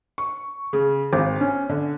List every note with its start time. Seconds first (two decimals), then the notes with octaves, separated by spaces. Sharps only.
0.18 C#6
0.73 C#3
1.13 G#1
1.41 C#4
1.69 D3